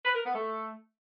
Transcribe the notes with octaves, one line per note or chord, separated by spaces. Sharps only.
B4
A#4
B3
A3